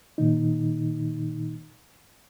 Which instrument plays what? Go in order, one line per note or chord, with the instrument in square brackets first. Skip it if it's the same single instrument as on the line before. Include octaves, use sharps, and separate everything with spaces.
[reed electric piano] A#2 D#3 D#4